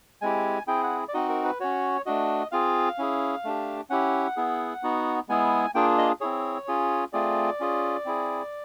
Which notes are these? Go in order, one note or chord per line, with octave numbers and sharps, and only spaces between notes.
G#3 C4 E4 G4 G#5
C4 E4 G#4 G5
F#5
D5
C4 D#4 F#4 D#5
A#4
B4
C#4 F#4 C#5
A3 D4 F#4 D#5
C4 F4 G#4 F5
C#4 E4 G#4
A3 D4 G4
C#4 E4 G4 F#5
B3 E4 G#4
B3 D#4 F#4
G#3 B3 E4 G#4 G#5
A#3 D4 F4 G#4 G5
D#5
C4 E4 G#4 C#5
C#4 F4 G#4
A3 C4 F4 G#4 D5
C#4 F4 G#4
C4 E4 G#4